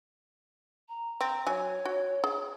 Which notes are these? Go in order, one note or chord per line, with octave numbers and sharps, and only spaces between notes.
A#5
C4 A#5
F#3 C#5 G#5
F#4
G#4